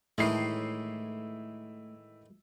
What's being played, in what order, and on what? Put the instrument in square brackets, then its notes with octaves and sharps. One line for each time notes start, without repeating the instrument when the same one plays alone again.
[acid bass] A2 [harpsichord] D#3 E3 G#3 [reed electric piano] A3 [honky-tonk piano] E4 C7